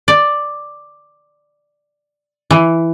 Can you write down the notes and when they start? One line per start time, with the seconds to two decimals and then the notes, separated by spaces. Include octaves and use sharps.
0.08 D5
2.51 E3